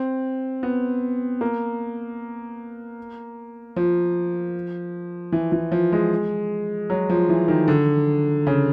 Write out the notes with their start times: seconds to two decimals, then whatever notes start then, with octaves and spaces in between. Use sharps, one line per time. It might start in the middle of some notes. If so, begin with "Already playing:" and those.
Already playing: C4
0.63 B3
1.41 A#3
3.76 F3
5.32 E3
5.52 E3
5.72 F3
5.92 G#3
6.90 F#3
7.10 F3
7.29 E3
7.48 D#3
7.68 D3
8.47 C#3